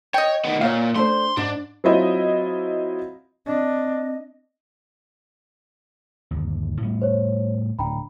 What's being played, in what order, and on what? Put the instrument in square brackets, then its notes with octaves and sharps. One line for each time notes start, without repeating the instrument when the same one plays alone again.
[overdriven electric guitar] C#5 [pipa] D#5 G5
[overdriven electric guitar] D#3 B3
[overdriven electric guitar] A#2 [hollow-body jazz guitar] C#5 F5
[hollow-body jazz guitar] A3 D4 C5 [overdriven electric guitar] C6
[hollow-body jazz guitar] G#2 [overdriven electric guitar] D4
[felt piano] F#3 C4 E4 F4 D#5 E5
[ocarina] C4 [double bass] D4 [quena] D#5
[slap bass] G1 D#2
A2 G3 B3
[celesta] C5 C#5
[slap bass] D1 D4 [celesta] G5 A#5 B5